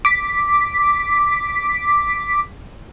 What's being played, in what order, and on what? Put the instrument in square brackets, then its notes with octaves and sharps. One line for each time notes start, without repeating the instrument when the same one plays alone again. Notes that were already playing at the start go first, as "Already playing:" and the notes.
[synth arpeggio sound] D6 B6